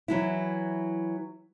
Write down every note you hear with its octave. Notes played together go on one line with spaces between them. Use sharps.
E3 F#3 E4